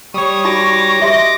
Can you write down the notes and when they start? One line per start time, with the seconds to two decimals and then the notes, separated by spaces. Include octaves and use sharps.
0.14 G3 C#5 C#6 D#6
0.45 D#4 F#4 B5 D6 A#6
1.00 G4 D#5 E5 C6